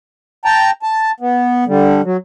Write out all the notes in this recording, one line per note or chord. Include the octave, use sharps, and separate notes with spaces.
G5 A5 A#5
A5
B3
D3 G3
F#3